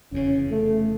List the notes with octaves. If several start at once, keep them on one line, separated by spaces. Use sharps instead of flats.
F1 E2 C#3 C#4
A3